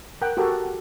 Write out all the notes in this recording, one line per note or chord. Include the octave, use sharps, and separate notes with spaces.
A#4 F#5 G5
F#4 G4 A4 A#4